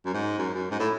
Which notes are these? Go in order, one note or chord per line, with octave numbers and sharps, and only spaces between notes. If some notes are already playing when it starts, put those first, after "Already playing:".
F#2
G#2
F#2
F#2
G#2
A2